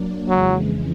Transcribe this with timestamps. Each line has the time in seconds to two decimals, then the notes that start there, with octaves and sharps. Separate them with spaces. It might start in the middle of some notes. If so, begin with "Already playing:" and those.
Already playing: F#3 A#3 D4
0.29 F2 C#3 E3 F#3 G#3